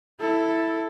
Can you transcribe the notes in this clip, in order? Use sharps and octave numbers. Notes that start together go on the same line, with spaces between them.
E4 A4